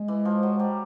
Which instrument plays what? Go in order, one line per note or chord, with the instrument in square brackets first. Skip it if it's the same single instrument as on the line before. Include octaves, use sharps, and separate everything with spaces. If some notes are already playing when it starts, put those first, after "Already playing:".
Already playing: [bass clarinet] G#3
[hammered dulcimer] E3
F3
F#3
G3